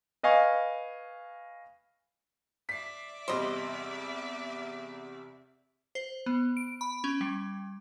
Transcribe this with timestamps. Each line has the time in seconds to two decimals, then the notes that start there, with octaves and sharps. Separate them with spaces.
0.23 B4 D#5 F5 G#5 C#6
2.69 D5 E5 B6 C7
3.28 E2 C3 G3 C5 D#5
5.95 C5
6.26 B3
6.57 D7
6.81 B5
7.04 C#4
7.21 G3